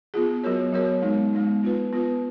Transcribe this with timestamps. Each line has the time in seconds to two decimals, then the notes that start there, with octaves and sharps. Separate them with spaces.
0.14 B3 F4 G#4
0.44 F#3 B3 F#4 A#4 C#5
0.73 F#3 B3 F#4 A#4 C#5
1.02 G#3 B3 D#4
1.33 G#3 B3 D#4
1.63 B3 F4 B4
1.93 B3 F4 B4